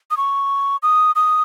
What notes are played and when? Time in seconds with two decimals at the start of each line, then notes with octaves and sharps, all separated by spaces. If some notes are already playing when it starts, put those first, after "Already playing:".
0.11 D#6
0.17 C#6
0.83 D#6
1.15 D#6